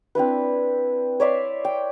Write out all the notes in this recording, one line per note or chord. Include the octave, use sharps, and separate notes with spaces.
C4 D4 E4 B4
C#5 D5 E5 C6
G5